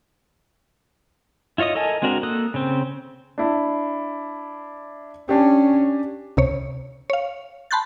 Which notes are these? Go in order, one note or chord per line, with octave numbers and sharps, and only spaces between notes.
E4 F4 C#5 D#5 D#6
A4 A#4 D#5 G#5 A5
G#3 C4 D4 F#4 A#4
A#3 A4 D#6 F#6
C#3 C4
D4 E4
C#4 D4 G4
C#2 C3 C#5
C#5 F5
A5 B5 C6 F#6 G6 A6